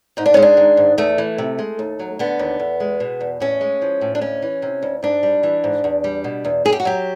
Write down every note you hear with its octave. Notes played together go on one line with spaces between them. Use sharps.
G#2 D#4
D4
G#3 C#4
D4
D#3
G#2
E2 A3
E3
C3
G#3
D#2
F#3
D3 B3
D#2
E2
G#3
B2
E2
A2 C#4
G#3
F3
A2
D4
D2 C#4
E3
C3
D2
G#2 D4
G3
E3
G#2
E2
G3
B2
E2
F#2 G#4
G4
F#4
F#3 G4